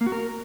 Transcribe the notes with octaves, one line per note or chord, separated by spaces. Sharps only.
A#3
F#4
A#4